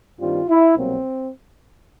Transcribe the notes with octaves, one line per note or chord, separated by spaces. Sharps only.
G2 D#3 G3 C4 F4
E4
C2 B2 F#3 A#3 C4